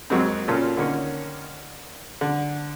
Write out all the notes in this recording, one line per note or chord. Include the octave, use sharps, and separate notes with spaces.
F2 F#3 G#3 A#3 C4
A#2 C#3 A#3 C#4 F4 A4
D3 D#3 A#3 C#4 C#5
D3